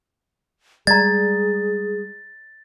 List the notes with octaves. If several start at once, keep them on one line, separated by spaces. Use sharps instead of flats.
G3 G#3 G#4 D5 A#5 A6